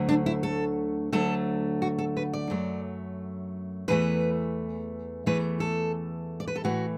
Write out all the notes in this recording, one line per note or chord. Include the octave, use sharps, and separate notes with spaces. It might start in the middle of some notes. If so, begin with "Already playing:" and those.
Already playing: D2 D3 F#3 A3
D4
E4
A4
D2 D3 F#3 A3 A4
F#4
A4
B4
D5
F#2 F#3 A3
E2 E3 A3 B4
E2 E3 A3 B4
A4
D5
B4
A4
A2 E3 A3 F#4